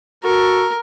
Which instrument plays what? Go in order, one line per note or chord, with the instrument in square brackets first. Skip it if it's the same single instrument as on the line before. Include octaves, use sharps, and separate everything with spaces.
[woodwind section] F#4 A4 [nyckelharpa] A#4